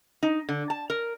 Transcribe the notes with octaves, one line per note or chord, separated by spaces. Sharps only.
D#4
D3
A5
A#4